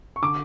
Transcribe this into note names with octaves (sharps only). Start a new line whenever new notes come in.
C#6
D3 D6